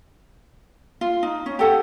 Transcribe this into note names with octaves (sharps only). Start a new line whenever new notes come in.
F4
D#4
C#4
G4 A4 F#5